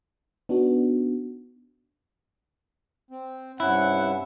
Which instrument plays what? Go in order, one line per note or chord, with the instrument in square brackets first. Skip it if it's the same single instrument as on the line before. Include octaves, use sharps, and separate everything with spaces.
[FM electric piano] B3 D4 D#4 F#4
[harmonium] C4
[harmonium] G2 C3 C#4 [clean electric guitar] E4 [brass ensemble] F#5